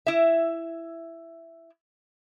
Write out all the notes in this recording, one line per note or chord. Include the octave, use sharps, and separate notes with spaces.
E4 E5